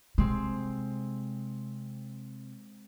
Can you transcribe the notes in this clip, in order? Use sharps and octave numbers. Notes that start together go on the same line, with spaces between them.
C3 G#3 C4